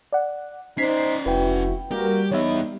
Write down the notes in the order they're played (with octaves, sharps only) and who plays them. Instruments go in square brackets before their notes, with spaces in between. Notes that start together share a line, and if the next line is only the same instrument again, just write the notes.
[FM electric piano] D5 F#5
[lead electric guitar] C#4 D5 [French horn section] D#4 C5 [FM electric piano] B6 C7
[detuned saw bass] F1 [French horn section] E4 F#4 [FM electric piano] B4 G5
[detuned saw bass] G3 [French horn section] A#3 F#4 A#4 [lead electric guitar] G4
[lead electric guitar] E2 B3 [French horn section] D#4 [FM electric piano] C#5 E5